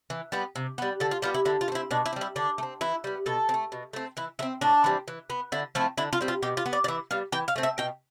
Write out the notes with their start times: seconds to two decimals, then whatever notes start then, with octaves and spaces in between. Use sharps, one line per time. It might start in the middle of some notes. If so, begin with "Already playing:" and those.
0.10 E3
0.32 G3 B3
0.56 C3
0.78 G3 B3
1.00 D3 A4
1.11 F4
1.22 G3 B3 F4
1.34 E4
1.45 D3 E4
1.61 F4
1.68 A3
1.72 C4 E4
1.91 B2 D4
2.06 E4
2.13 G3 C4
2.21 E4
2.36 D3 D4
2.58 A3
2.63 C4
2.81 E3 E4
3.04 G3 B3
3.26 B2 A4
3.49 C4
3.54 A3
3.72 B2
3.93 A3 C4
4.17 E3 E4
4.39 A3 E4
4.42 C4
4.61 A2 D4
4.84 E3 G3 C4
5.08 E3
5.30 B3
5.52 D3 E4
5.75 F3 A3 C4 E4
5.98 D3 E4
6.13 F4
6.21 G3 C4
6.28 F4
6.42 B2 G4
6.57 F4
6.66 B3
6.73 D5
6.84 D5
6.88 E3 E5
7.11 G3 B3 F5
7.32 E3 G5
7.48 F5
7.56 A3 C4
7.63 E5
7.78 B2 G5